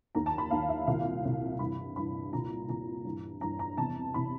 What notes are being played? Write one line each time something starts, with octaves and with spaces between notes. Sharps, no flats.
D#2 D#3 A#5
A5
B5
D#2 D#3 F5
E5
C2 A#2 F5
C2 A#2
G2 E3 B5
G2 E3 B5
C2 A#2 A#5
C2 A#2 A#5
G2 E3
G2 E3 A#5
A#5
E2 C3 E3 A5
C3 E3 B5